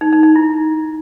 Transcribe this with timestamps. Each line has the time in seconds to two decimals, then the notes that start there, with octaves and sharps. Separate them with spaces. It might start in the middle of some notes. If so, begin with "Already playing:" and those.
0.01 D#4
0.13 D#4
0.23 D#4
0.36 E4